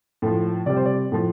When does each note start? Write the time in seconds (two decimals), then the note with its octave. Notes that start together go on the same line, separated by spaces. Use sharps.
0.22 A2 F3
0.66 C3 G3 D5
0.76 C5
0.85 D5
1.12 A2 F3